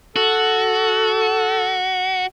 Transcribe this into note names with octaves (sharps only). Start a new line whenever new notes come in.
F#4 A4